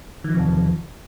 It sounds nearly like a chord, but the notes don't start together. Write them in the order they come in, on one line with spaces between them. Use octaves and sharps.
D#3 F3 C3 E2